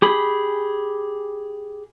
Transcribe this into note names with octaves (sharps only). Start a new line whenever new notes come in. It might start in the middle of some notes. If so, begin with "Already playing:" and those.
G4 G#4 B5